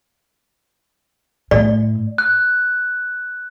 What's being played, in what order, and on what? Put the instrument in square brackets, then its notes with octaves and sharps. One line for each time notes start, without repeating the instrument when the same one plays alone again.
[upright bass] A2 [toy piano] D5
[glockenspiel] F#6